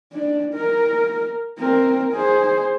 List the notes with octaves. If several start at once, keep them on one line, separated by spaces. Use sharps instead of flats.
D4
A#4
C4 A#4
G#4 C5